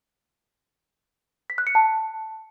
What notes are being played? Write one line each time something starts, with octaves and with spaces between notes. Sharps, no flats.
B6
F#6
C#7
A5